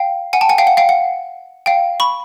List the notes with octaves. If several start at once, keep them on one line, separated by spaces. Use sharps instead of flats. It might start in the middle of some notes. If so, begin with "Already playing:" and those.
Already playing: F5 G5
F#5 G#5
G5 A5
F#5 G#5
F5 G5
F#5
F5 G5
F#5
F5 G5
B5 C#6